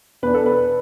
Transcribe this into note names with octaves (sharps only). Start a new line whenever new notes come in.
E2 B2 B3 D4 B4
A4
B4